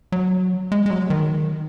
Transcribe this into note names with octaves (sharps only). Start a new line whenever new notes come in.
F#3
G#3
G#3
F#3
D#3